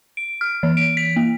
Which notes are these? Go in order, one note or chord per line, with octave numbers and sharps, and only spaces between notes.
D7
F6
E3
D7
B6
A#3